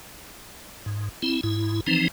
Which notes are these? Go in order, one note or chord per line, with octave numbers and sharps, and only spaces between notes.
G#2
C4 E4
G#2 E4
E3 F3 C4 D#4